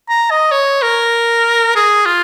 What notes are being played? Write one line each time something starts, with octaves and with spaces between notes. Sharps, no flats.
A#5
D#5
C#5
A#4
G#4
F4